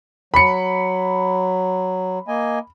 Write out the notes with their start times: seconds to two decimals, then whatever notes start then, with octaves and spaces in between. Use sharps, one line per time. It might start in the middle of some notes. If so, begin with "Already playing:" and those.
0.34 F#3 B5 C#7
2.28 A#3 D#5 G#5